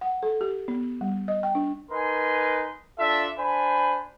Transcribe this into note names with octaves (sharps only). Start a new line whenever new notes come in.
F#5
A4
G4
B3
G3
D#5
G5
D4
D#4 A#4 B4 G#5 C6
D4 F4 A4 E5
D4 C5 G#5 B5